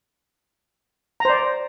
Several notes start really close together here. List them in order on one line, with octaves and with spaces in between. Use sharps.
A#5 C5 D5